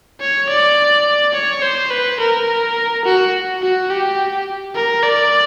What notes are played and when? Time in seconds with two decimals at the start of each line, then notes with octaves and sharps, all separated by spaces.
0.20 C#5
0.49 D5
1.34 C#5
1.62 C5
1.91 B4
2.20 A#4
3.05 F#4
3.62 F#4
3.90 G4
4.75 A#4
5.03 D5